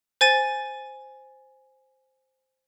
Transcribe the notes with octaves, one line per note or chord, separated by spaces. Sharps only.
C5 G#5 A6 D#7